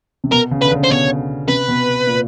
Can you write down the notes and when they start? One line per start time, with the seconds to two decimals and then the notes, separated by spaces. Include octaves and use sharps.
0.24 C3
0.32 B2 A#4
0.51 C#3
0.62 D3 B4
0.71 C#3
0.84 C5
0.90 B2 C#5
1.48 C3 B4
1.68 B2
2.07 A#2